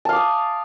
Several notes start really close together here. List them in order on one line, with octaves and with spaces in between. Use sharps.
A5 F5 D6 D#6